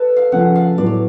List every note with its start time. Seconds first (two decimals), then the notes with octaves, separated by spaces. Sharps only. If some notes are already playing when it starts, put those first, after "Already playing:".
Already playing: A4 B4
0.16 F5
0.32 C#3 F3 A3 C#4 F#5
0.55 F5
0.78 A2 F#3 B3 D5
0.86 C#5